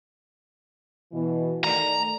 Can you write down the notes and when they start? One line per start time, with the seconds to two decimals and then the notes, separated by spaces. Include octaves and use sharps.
1.12 B2 E3
1.64 D#3 A3 D5 A#5